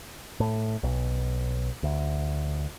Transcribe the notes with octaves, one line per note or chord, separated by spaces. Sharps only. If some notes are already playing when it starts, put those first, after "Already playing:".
A2
B1
D2